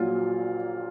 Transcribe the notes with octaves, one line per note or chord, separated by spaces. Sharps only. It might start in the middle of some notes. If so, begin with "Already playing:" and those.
Already playing: A#1 A#2 F#3 F4